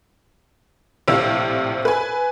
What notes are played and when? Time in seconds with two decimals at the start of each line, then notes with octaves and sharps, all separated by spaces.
1.08 A#1 A2 C3 C4 F5 E6
1.85 B4 G#5